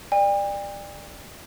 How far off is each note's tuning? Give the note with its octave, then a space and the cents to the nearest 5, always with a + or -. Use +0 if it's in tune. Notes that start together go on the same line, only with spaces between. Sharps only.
D5 +15 G5 +40